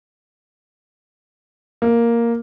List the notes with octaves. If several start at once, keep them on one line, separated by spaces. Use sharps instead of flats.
A#3